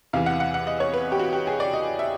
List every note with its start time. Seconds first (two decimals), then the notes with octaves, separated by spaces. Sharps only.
0.13 E2 C3 E3 F5
0.26 F#5
0.40 F#5
0.54 F#5
0.67 D#5
0.80 C#5
0.94 B4
1.12 G4
1.19 F#4
1.33 G4
1.47 G#4
1.60 D5
1.73 D#5
1.99 E5